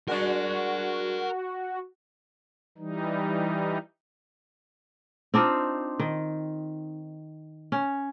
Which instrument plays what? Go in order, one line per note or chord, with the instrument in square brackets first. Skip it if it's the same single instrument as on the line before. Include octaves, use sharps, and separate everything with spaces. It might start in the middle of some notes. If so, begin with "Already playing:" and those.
[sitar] G#3 D4 D5 [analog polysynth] F#4 [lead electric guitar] A#4 F#5
[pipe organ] E3 G3 D#4
[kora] C4 D4 D#4 F4
D#3
C#4